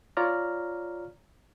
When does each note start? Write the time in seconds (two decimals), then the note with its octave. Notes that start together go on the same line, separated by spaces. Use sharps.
0.17 F4 C#5 D5 A#5 F6